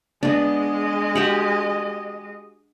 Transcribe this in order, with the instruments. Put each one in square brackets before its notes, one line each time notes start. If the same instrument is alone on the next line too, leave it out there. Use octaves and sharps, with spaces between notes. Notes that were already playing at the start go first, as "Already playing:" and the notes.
[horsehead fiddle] G#3 D#5 [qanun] B3 D4
[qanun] F#4 G4 F#5